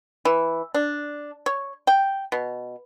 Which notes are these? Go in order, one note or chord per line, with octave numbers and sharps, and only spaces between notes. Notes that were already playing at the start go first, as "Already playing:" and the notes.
E3
D4
C#5
G5
B2